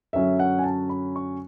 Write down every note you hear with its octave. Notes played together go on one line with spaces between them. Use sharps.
F#2 D3 F#3 C#4 E5
F#5
G#5
A5
B5
C#6